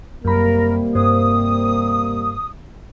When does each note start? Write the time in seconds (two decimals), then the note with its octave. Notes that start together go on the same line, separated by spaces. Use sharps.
0.25 F#2 C3 G3 A#3 A#4 B5
0.95 G2 C5 D#6